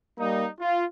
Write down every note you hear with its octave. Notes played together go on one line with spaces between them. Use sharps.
G3 A#3 D#4
F4